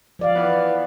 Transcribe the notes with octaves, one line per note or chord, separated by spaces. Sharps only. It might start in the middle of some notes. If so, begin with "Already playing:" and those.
F3 D5 F5
E3 B3